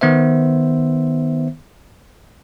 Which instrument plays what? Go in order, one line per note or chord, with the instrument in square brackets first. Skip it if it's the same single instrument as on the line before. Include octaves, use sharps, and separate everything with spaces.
[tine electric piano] D#3 B3 C5 E5